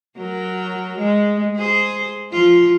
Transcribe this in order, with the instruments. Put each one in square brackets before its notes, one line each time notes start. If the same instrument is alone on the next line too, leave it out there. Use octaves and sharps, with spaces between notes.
[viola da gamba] F#3 A#4
G#3
G#4 C5
F3 F4